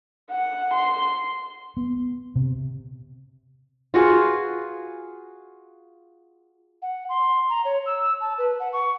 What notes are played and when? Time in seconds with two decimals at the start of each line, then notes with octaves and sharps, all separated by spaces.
0.31 F#5
0.74 C6
1.77 B3
2.36 C3
3.94 F4 F#4 G#4 B4
6.82 F#5
7.09 C6
7.50 A#5
7.65 C#5
7.86 E6
8.21 A5
8.38 B4
8.60 F#5
8.73 C#6